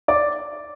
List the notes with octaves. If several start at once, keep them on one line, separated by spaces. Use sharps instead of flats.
D5 D6